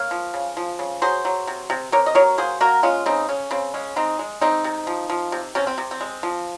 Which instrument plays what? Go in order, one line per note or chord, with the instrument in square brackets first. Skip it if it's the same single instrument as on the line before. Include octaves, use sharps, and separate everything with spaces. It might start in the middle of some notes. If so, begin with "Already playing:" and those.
Already playing: [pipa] A#3 C#5 F5
F3
C#3
F3
C#3
F#3 G#4 C5
F#3
C3
C3
C3 A#4 C#5
D#5
F#3 A#4 C#5
A#3 G#4 C5
A#3 F#4 A#4
G#3 C#4 F4
C#3 C4 D#4
C#3 C#4
C#3 C4
G#3 C#4
G#3 C4 D#4
G#3
G#3 C4 D#4
C3
F3
F3
C3
C3 C#4
C4
C3
C4
G#3
F3